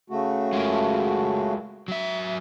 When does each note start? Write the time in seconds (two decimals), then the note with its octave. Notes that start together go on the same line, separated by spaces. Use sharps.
0.10 C#3 A3 F#4
0.53 G#3 F4 A#4
1.88 F#3 E5